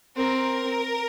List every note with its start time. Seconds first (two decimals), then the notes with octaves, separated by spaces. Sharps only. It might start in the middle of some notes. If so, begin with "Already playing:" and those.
0.16 C4 A#4